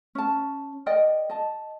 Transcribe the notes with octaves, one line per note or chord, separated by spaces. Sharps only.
C#4 A5
A#4 D5 D#5 G5
D#5 A5